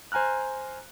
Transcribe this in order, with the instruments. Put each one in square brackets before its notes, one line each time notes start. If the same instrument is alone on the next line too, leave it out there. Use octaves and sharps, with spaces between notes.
[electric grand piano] C5 G#5 A#5 F6 F#6